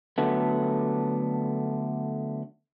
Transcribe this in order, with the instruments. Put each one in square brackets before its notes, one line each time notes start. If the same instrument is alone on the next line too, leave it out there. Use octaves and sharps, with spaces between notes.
[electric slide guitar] D3 F#3 A3 B3